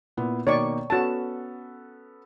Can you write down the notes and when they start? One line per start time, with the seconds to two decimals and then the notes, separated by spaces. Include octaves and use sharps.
0.17 A#2 B3 E4
0.47 B2 D#3 A#3 C#5 D5 C#6
0.90 B3 C#4 F#4 A4 A5